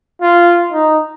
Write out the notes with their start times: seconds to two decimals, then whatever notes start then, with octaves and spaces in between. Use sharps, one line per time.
0.22 F4
0.72 D#4